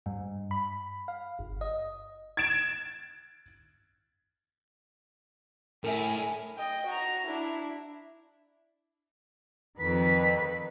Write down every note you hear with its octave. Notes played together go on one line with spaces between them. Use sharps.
G2
B5
F5
G1
D#5
G#6 A6 D7 E7
A2 A#4 E5 G#5
D#5 G5
F#4 A#5
D4 E4
F2 D#3 B4 B6